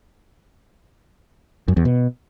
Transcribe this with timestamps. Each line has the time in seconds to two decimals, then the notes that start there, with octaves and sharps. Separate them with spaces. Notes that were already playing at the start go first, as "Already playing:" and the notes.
1.68 F#2
1.77 E2
1.85 B2